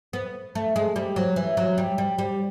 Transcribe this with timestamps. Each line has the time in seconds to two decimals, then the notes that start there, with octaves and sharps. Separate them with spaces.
0.13 B3
0.55 A3
0.76 G#3
0.96 G3
1.16 F#3
1.36 E3
1.57 F#3
1.78 G3
1.98 G3
2.18 G3